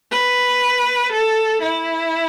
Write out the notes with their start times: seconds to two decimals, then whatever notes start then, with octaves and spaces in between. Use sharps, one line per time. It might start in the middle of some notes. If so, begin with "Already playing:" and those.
0.12 B4
1.12 A4
1.62 E4